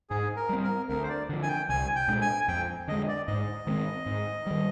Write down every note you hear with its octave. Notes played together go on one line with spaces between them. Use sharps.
G#2 G#4
A#4
G3 C4
A#4
D2 A#4
C5
D5
D3 F3
G#5
G5
C2 G#5
G5
A#2 G#3 D4
G#5
F2 G5
D3 G#3 D#5
D5
G#2 D#5
D#3 G#3 C4
G#2
D#3 G3